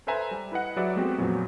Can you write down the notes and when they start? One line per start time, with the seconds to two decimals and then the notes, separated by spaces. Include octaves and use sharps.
0.07 A4 B4 C5 E5 G#5 A#5
0.31 G3
0.52 E4 B4 D#5 F#5
0.76 F#3 G#4 B4 D5 E5
0.96 G#3 A3 B3 C4 F#4 G4
1.18 F2 A#2 F#3 B3